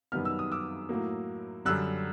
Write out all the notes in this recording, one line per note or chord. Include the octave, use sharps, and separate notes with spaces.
F#2 D#3 G3 B3 F6
E6
D#6
D6 E6
A2 F#3 A#3
F#2 D3 G3 E6 F#6